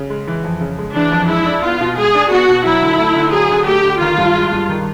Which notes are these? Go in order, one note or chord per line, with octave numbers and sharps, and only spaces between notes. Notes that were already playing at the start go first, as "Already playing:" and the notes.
Already playing: C#3
G#3
E3
F2
C#3
G#3
E3 D4
F2
G#3 E4
D4
B3 F4
B2
G#3 G#4
D4
B3 F#4
B2
F#3 E4
D3
A3
D3
F#3 G#4
D3
A3 G4
D3
D#3 F4
G2
G#3
G2
D#3